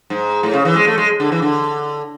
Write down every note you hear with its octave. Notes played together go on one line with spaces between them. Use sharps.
G#2
A2
C#3
E3
G#3
A3
G#3
D3
E3
D3